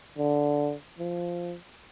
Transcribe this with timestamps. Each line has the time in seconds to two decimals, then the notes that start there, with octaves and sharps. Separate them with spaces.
0.18 D3
0.99 F3